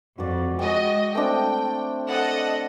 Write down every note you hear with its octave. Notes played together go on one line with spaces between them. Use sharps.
F2 F#4 D5
G#3 F#4 D#5 G5
A3 C4 D4 G5
A4 D#5 F#5